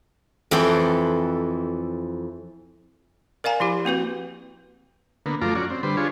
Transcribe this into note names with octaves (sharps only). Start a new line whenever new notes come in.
F2 E3 A4 G5 C6
A#4 D5 F5 G#5 A#5
F3 E4 G4
A#3 C4 F#4 B4
D3 A#3 B3
F#2 F3 A3 F4 A#5 D6
C#4 F#4 D5
C4
D3 G3 B4 C5
D4 F4 G#4 C#5